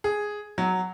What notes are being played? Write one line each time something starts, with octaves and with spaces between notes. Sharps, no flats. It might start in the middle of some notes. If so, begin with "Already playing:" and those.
G#4
F#3